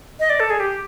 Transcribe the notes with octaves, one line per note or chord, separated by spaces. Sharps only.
D#5
D5
A4
G#4
G4